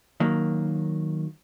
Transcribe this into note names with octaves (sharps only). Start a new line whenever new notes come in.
D#3 F#3 A#3